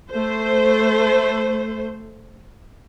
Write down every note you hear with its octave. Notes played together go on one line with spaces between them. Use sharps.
A3 C5